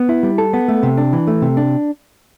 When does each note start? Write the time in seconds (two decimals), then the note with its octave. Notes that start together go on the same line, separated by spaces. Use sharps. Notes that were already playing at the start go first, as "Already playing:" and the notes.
Already playing: B3
0.09 E4
0.23 G3
0.38 A4
0.53 B3
0.68 A3
0.83 C3
0.97 D4
1.13 E3
1.27 A3
1.42 C3
1.57 D4